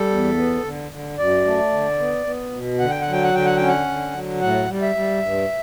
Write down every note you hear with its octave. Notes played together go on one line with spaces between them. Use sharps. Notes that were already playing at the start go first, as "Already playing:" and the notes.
Already playing: G3 A4
E2
B3
D3
D3
F#2 D5
A3
D3
B3
B3
B2
D3 F#5
G5
F#5
F#3
G5
F#5
D3 G5
F#5
C#4 G5
F#5
D3
F#3
A2 F#5
G3
E5
G3
G2